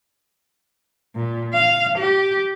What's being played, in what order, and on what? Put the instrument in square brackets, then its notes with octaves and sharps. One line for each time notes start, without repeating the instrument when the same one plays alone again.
[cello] A#2
F5
G4